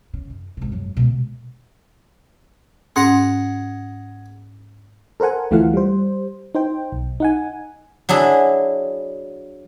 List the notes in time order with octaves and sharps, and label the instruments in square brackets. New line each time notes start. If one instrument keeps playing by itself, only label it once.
[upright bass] C#3
F#2
G#1 C3
F#2 F#3
B2 G#3
[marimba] G#2 C#4 C6 [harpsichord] G#4 F#5 A#5
[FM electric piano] A4 A#4 C5 F#5 G#5
D2 E3 A3 F4 F5 F#5
G3 C5
D#4 C5 G5
B1
D#4 F#5 G#5
[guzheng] F#3 D4 E4 G#4